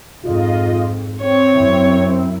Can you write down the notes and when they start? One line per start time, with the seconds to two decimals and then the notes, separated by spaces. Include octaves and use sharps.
0.24 F2 G#2 F4 D#5
1.21 C4 C#5
1.53 F#2 E4